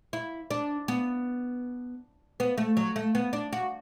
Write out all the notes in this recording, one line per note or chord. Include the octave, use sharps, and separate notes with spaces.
E4
D4
B3
B3
A3
F#3
A3
B3
D4
F#4